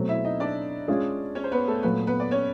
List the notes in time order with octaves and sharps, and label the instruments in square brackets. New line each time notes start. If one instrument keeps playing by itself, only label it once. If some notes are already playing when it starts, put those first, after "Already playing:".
Already playing: [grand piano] B2 F#3 A3 C4
[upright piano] E4 E5
D#4 D#5
D4 D5
[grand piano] G#3 C#4 F4 G#4
[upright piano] C#4 C#5
C5
B3 B4
A3 A4
[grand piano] A#2 F#3 A3 [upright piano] B3 B4
[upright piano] B3 B4
D5
C#4 C#5